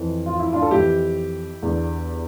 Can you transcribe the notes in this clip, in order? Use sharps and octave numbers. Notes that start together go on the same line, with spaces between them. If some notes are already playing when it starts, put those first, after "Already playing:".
Already playing: F2 E3
F4
E4
D4 F4
A4
F2 E3 E4 G4
E2 D3